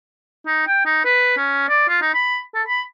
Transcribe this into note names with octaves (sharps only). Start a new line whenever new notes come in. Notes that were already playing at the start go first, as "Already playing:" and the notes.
D#4
G5
D#4
B4
C#4
D5
F4
D#4
B5
A4
B5